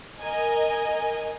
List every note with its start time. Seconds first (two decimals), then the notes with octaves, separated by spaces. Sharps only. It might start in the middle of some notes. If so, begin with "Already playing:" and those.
0.20 A#4 D#5 G#5